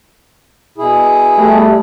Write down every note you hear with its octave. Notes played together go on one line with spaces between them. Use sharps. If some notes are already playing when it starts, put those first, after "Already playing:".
B2 E4 G#4
G3 A3